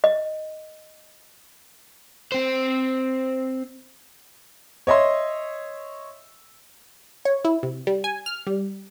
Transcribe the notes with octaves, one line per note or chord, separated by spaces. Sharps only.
D#5
C4 C5
C#5 D#5 E5 C6
C#5
E4
C3
G3
G#5
F6
G3